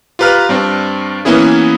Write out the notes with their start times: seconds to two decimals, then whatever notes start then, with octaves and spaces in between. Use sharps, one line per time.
0.19 F4 G4 B4 A#5 F6
0.49 G2 C4 D4
1.25 E3 A#3 B3 C#4 E4 G#4